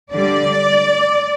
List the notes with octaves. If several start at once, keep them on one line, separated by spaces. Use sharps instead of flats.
D3 G3 D5